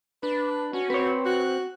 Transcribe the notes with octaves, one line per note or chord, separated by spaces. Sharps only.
D4 B4
C#4 F#4
C4 B4 C#5
F#4 F#6